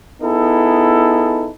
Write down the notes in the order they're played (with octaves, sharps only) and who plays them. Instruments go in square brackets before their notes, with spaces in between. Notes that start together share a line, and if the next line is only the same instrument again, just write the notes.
[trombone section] B3 D#4 E4 G#4 A4